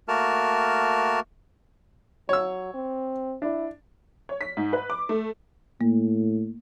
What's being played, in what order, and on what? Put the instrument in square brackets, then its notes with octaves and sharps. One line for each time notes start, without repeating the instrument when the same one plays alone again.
[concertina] A3 A#3 F#4 A#4 A5 F6
[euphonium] F#3 [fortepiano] C#5 E6
[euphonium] C4
[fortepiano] D4 [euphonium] E4
[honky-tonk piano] C#5
B6
G#2
B4
D6
A3
[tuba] A2 [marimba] A#3